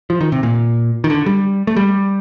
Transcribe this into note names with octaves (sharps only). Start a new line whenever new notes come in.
F3
D#3
C3
A#2
D#3
D3
G3
A3
G3